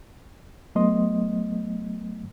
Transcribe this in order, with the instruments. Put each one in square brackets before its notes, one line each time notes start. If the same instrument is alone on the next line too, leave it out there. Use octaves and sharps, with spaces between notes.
[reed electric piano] F#3 A3 B3 D#5 C6 D#6